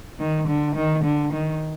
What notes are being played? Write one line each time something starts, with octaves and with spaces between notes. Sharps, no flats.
D#3
D3
D#3
D3
D#3